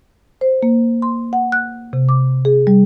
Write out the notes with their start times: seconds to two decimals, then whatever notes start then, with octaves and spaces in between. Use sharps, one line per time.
0.41 C5
0.63 A#3
1.02 C6
1.33 F#5
1.52 F#6
1.93 C3
2.09 D6
2.45 G#4
2.67 G3